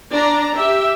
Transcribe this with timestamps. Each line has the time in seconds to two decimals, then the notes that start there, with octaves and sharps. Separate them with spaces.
0.12 D4 D5 A#5
0.56 G4 E5